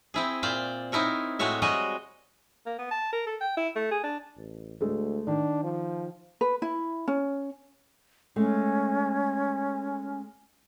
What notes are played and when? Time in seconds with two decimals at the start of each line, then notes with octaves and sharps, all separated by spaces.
0.14 C4 E4 G#4
0.43 A#2 C5 D5 F5 G5
0.92 C4 D#4 E4 A#4 C#5
1.39 A2 G#3 C4 F#4 C#5 E5
1.62 G3 G#3 F#4 G#4 D#5
2.66 A#3
2.79 B3
2.91 A5
3.13 A#4
3.27 A4
3.41 G5
3.57 E4
3.76 A3
3.91 G#4
4.04 D4
4.37 A1
4.81 D2 G#3 A3
5.27 D#3 D4
5.63 F3
6.41 B4
6.62 E4
7.08 C#4
8.36 G#3 A3 C#4